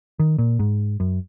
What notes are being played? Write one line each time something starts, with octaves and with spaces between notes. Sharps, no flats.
D#3
A#2
G#2
F#2